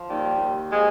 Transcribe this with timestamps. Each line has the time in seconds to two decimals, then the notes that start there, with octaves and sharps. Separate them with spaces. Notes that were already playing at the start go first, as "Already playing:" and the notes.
Already playing: F3
0.10 D#2 G3
0.40 D#2
0.73 F3 G#3